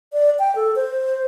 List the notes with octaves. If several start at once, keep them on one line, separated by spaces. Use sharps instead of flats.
D5
G5
A4
C5